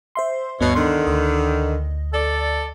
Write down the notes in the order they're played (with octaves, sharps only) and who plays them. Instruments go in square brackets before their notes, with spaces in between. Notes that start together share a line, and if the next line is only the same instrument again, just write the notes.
[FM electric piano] C5 E5 C6
[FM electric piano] D2 G2 B3 [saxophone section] B2 C#5
[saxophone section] D3 D#3 [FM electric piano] C6
[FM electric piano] D2 D#5
[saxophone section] A4 D5